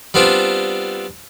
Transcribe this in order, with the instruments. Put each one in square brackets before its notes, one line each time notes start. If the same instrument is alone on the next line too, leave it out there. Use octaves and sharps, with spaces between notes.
[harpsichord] G3 B3 C4 D4 F4